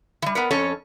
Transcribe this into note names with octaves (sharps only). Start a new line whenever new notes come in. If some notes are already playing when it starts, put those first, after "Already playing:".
E3 G3
B3 A#4 B4
F2 C#4 A4 C#5